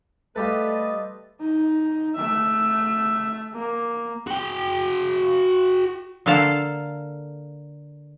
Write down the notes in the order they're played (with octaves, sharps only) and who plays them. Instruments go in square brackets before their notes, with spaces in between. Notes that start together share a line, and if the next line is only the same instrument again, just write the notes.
[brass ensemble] G3 [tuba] A3 [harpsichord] F4 G4 A4 [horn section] B4 D#5
[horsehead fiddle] D#4
A3 E5
A#3
[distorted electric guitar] F#4 G5
[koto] D3 A#3 A4 F5 A5